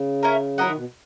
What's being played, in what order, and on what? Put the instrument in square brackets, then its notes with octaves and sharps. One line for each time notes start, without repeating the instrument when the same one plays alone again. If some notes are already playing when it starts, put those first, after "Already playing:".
Already playing: [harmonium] C#3
[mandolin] C#4 E4 A#4
[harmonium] F#3 [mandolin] E4 A#4 D#5 F#5
[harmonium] D#3
B2